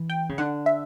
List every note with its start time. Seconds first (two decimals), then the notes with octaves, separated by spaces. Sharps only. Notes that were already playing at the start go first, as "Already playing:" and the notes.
Already playing: E3
0.10 G5
0.29 C#3
0.38 D3 F#5
0.66 E5